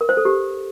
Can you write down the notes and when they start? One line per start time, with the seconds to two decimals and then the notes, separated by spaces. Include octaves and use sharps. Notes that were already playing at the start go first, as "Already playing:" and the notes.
0.01 A#4
0.09 C5
0.17 A4
0.25 G4